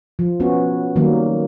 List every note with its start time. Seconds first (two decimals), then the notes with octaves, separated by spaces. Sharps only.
0.19 F3
0.40 B3 C#4 F#4
0.96 D#3 F#3 G3 A#3